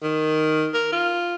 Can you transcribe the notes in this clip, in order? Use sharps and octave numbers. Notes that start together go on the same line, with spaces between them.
D#3
A#4
F4